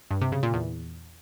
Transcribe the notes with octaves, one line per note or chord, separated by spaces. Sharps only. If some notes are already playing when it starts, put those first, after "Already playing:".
G2
C3
C#3
A#2
E2